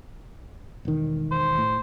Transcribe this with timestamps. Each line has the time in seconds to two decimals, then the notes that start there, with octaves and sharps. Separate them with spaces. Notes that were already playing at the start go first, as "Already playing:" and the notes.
0.85 E1 D#3
1.31 C5
1.58 A2